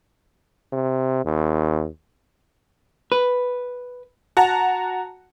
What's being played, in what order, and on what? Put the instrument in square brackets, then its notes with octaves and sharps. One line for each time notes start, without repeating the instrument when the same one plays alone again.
[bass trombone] C3
D#2
[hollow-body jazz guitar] B4
[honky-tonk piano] F#4 F#5 A5 A#5